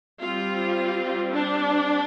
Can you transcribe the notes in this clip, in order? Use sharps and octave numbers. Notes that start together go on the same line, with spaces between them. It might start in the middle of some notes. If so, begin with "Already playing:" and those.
G3 C4 F4
D4